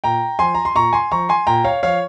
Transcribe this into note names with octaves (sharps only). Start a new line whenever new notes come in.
A#2 G5 A#5
F3 G#5 C6
A#5
C6
A#2 A#5 C#6
G#5 C6
F3 A#5 C#6
G#5 C6
A#2 G5 A#5
C#5 F5
F3 C#5 F5